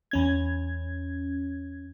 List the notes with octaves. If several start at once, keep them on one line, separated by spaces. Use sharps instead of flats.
E2 C#4 G#6